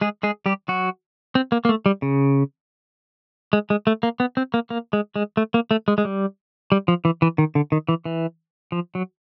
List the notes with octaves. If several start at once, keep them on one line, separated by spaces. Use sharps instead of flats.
G#3 G#4
G#3 G#4
G3 G4
F#3 F#4
C4
A#3
A#3
A3
G3
C#3
G#3
G#3
A3
A#3
B3
C4
A#3
A#3
G#3
G#3
A3
A#3
A3
G#3
G#3
G3
G3
F3
E3
E3
D#3
D3
D#3
E3
E3
F3
F#3